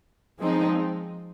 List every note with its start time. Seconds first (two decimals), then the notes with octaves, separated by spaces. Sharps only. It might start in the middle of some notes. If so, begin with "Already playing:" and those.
0.40 F3 G#3 C4 D#4